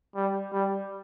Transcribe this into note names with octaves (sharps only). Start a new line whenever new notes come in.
G3
G3